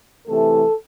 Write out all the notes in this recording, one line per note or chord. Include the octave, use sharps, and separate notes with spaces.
C3 E3 A3 A4